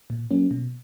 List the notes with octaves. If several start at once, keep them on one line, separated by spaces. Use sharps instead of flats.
A#2
F#3 A#3 C#4
B2